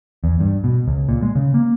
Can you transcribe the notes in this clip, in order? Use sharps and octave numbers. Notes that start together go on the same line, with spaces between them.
E2
G2
B2
C#2
A#2
G#3
C#3
A#3